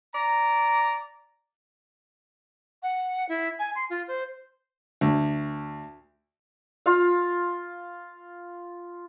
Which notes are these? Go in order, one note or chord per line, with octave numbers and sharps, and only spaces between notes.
D5 A#5
F#5
E4
G#5
C6
F4
C5
D2
F4 F5